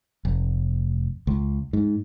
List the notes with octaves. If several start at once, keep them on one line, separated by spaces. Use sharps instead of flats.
F1
C#2
G#2